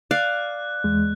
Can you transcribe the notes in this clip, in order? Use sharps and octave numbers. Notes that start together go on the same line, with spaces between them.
D5 F5 F#6
E2 G#3